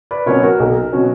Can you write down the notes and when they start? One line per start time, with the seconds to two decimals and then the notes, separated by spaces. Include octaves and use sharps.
0.11 B4 D5
0.26 B2 F#3 C#4 A#4 C#5
0.43 F#4 A#4
0.60 B1
0.93 B2 F#3 C#4